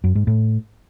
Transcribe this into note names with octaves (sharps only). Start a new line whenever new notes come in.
F#2
G#2
A2